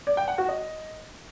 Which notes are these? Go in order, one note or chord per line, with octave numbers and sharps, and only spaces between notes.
D5
G5
F#5
F#4
D#5